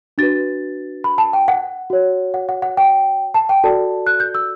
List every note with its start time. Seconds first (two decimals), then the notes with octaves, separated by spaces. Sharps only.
0.18 D4 F#4 B4 A6
1.04 B5
1.18 A5
1.33 G5
1.48 F#5
1.90 F#4 C#5
2.34 F#5
2.49 F#5
2.62 F#5
2.77 G5
3.34 A5
3.49 G5
3.64 F#4 A4 D5 A5
4.07 F#6
4.20 G6
4.35 E6